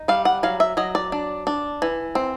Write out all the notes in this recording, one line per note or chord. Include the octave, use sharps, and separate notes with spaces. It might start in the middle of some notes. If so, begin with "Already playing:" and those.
Already playing: D#4
G3 F5
F#5
F#3 F5
E5
F#3 D#5
D5
D4
D4
E3
C4